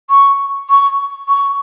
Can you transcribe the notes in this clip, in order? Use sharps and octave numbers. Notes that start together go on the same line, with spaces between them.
C#6
C#6
C#6